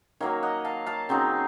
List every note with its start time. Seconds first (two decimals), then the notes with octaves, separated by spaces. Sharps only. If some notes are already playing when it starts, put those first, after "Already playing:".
0.20 D#3 F#3 A#3 C#5 F5
0.43 D#5 F#5
0.65 F5 A5
0.86 F5 A5
1.09 C#3 F#3 C4 D#4